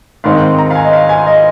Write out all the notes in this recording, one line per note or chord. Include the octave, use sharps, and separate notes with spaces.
G#2 D#3 G#3 C4 F5
A#5
F5
G#5
D#5
F5
G#5
D#5